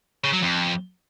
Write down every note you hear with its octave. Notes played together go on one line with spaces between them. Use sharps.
C#3
F#3
F2